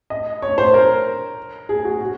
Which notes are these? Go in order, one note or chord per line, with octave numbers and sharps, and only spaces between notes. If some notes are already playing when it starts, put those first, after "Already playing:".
D#5
C#5
C5
A#4
G#4
F#4
F#4